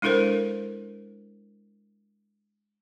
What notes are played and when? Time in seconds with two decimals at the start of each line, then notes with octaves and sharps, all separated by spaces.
0.02 G#3 D4 E4 A4 A#4 C5